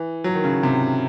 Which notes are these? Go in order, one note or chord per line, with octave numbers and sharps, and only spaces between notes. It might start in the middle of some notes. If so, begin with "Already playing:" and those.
Already playing: E3
F#3
D#3
C#3
C3